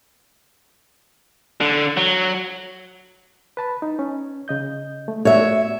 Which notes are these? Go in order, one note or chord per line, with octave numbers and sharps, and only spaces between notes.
D3
F#3
B4 A5 B5
D#4
C#4
C#3 D#5 G6
A3
A3 B3 F#4 C#5 E5